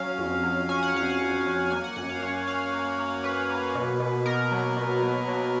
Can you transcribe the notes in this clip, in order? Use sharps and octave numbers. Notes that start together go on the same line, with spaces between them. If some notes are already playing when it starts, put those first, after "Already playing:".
Already playing: F#3 C#4 F5
F2
F#3
C#4 G#5
F#5
F2 F5
F#5
F2
C#4
A#3 G#5
F#5
F#2 F#5
F5
C#4 C#5
C#4 F5
A#3
A#3
C#4 B4
A#3
B2
B2
B3 A#4
F#3
B2
F#3
F#3